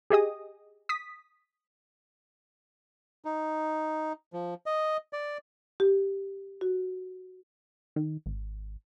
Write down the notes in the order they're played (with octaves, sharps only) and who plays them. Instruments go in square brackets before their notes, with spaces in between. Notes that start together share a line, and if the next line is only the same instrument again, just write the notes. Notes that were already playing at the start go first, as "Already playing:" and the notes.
[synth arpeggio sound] G4 G#4 D#5 D#6
D#6 B6
[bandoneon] D#4
F3
D#5
D5
[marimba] G4
F#4
[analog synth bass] D#3
G#1